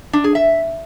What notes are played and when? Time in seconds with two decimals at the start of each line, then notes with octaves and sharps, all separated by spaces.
0.13 D4
0.24 G#4
0.35 E5